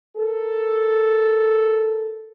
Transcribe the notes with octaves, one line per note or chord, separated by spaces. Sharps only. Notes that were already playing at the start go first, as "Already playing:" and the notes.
A4 A#4